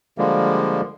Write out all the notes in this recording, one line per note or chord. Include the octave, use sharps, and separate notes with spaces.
D3 F3 G3 G#3 A#3